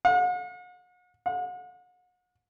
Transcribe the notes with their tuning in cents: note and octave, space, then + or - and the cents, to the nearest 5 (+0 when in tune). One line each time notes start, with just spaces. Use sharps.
F#5 -45
F#5 -40